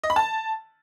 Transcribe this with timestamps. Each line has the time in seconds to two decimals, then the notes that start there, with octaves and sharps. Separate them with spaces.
0.03 D#5
0.10 B5
0.16 A5